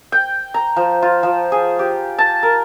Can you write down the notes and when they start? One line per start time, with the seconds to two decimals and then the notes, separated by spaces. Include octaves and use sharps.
0.12 G5
0.54 A#5
0.76 F3
1.02 F4
1.23 F3
1.52 G#4
1.79 G4
2.18 A5
2.43 A#4